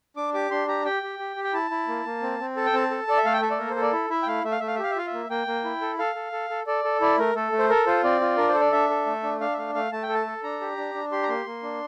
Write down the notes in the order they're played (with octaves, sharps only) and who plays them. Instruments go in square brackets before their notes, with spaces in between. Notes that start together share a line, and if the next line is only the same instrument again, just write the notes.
[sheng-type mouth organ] D4 D6
G4 D6
D4 C6
G4 A#5
G4 G5
G4
G4
G4
G5
E4 A5
E4
A#3
A#3
C4
C4
A4 A5
G5
C4 A5
A4
A4 D5
E5
A3 F5
G5
A4 E5
D5
A#3 A#4
C5
A4
D5
E4
E4 E5
G5
A3 F5
A3 E5
F5
A3 E5
F5
E5
G4 F5
E5
F4 F5
E5
A#3
A#3 G5
A#3
E4
A4
A4 F5
A4
A4
A4
A4 D5
A4
E4 D5
A3 A#4
A3 A4
A3
C5
A4 A#4
F4 C5
C4 D5
F4
D4 A#4
C5
A4
D5
D4 E5
A4
A3
D4
D4 F5
E5
A3 F5
A3 F5
A3 A5
G5
A4
A5
A4
D4 A#5
G4
D4
D4
G4 C6
A#5
A#3 C6
A#3
D4